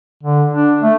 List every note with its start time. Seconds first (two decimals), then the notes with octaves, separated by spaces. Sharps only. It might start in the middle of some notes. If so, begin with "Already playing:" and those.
0.23 D3
0.54 D4
0.83 A3